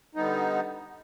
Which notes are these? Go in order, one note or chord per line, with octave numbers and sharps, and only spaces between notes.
D3 G3 B3 D#4